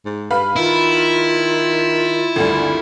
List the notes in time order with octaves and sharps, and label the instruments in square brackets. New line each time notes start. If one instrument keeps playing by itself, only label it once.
[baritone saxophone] G#2
[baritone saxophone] G2 [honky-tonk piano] B4 F5 B5
[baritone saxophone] D#3 [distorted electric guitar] E4 [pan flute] F4
[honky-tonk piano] G#1 D2 G2 [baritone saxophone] D3